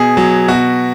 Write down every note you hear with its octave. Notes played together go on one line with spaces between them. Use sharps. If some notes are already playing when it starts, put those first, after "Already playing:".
Already playing: B2 G#4
F#3
B2 F#4